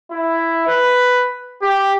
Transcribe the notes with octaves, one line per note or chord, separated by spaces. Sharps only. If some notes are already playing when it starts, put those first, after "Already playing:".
E4
B4
G4